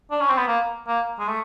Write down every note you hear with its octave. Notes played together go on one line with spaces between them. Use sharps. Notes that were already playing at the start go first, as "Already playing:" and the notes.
D4
C#4
C4
B3
A#3
A#3
G#3
A3